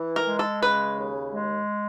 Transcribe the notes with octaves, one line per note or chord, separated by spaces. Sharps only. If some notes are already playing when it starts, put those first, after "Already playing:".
Already playing: E3
A#4
G#3
A4
C#3 B4
D#2
G#3